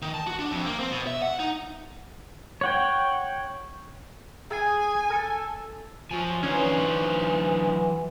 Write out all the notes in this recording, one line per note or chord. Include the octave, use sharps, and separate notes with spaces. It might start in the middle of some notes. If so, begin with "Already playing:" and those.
D#3
A5
F#4
D4
F2
A#3
C4
B2
E5
F#5
D#4
C#5 F#5 G5
G#4 G#5
A4
F3 F#3 F#4 G#5
D3 E3 F#3 C#4 D#4 F#4 C5